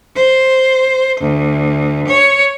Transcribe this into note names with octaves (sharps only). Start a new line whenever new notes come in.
C5
D2
C#5